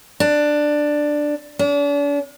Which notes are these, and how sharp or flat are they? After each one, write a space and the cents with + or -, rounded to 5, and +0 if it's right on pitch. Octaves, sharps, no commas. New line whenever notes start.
D4 +10
D4 -40